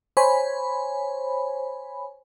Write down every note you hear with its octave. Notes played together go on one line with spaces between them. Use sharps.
C5 C#5 G#5 B5